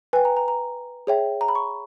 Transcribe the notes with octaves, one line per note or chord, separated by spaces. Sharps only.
B4 G5 G#5
A#5
A#5
A#5
G#4 C#5 E5 G5
A#5
B5
C#6